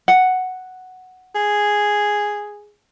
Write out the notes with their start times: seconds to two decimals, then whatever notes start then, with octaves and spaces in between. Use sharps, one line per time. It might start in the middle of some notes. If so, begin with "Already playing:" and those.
0.08 F#5
1.35 G#4